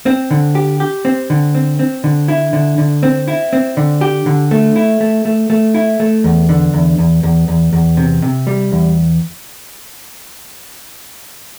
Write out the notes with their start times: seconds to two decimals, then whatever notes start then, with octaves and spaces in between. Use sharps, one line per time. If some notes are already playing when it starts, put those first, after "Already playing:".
0.06 C4
0.31 D3
0.55 G4
0.80 G4
1.05 C4
1.30 D3
1.55 C4
1.79 C4
2.04 D3
2.28 E4
2.53 D3
2.78 D3
3.03 C4
3.28 E4
3.53 C4
3.77 D3
4.01 G4
4.26 D3
4.51 A3
4.76 E4
5.00 A3
5.25 A3
5.50 A3
5.74 E4
6.00 A3
6.24 E2
6.49 D3
6.74 E2
6.98 E2
7.23 E2
7.48 E2
7.73 E2
7.97 C3
8.22 C3
8.47 G3
8.72 E2